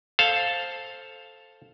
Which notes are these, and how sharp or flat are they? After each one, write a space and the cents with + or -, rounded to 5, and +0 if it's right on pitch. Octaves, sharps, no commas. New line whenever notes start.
A4 +0 C5 +10 F5 +0